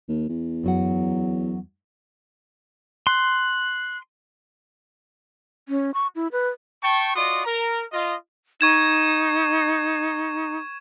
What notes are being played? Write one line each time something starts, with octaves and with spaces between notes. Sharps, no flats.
D#2
E2
F#2 F#3 F#5
C6 F#6
C#4
C#6
E4
B4
G5 A5 C#6
F4 F#4 D5 D#5 C6 D#6
A#4 A#5
F4 D#5
D#4 C#6 G#6 E7